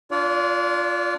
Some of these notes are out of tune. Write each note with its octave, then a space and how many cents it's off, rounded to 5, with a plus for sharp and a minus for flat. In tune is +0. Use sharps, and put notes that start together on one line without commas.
D4 +0 F4 +0 D5 -40